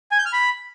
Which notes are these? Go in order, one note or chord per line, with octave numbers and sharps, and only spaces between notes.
G#5
G6
F6
B5